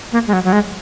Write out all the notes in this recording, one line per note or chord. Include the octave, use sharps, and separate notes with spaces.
A#3
G#3
F#3
F#3
G#3